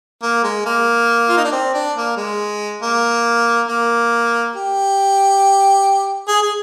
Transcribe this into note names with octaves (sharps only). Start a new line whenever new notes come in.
A#3
G#3
A#3
F4
D#4
D4
C4
D4
A#3
G#3
A#3
A#3
G4
G#4
G#4